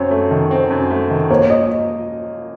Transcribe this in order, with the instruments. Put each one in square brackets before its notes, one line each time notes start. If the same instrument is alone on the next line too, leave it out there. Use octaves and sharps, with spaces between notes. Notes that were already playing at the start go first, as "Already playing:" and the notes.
Already playing: [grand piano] F#2 C4 [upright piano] C#5
[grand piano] A3
D#3
C4
F#2
A3
D#3
[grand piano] A#3 [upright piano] C#5
[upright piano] D#5